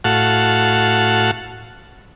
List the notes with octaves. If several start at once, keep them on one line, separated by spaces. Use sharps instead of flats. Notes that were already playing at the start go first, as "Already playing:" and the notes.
A2 F#4 F5 F#5 A5